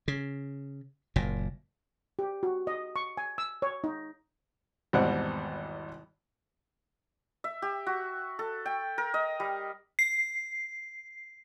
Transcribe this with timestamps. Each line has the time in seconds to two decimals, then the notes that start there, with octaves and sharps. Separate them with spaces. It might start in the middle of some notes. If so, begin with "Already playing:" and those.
0.08 C#3
1.16 F#1 A#2
2.19 G4
2.43 F#4
2.67 D#5
2.96 C#6
3.17 G#5
3.38 E6
3.62 C#5
3.84 D#4
4.93 G#1 E2 B2 G3 C4 F#5
7.44 E5
7.62 G4
7.87 F#4
8.39 A4
8.66 G5
8.98 A#4
9.14 D#5
9.40 G3
9.99 C7